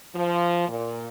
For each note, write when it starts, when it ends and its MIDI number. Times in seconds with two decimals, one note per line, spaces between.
0.15 0.68 53
0.69 1.08 46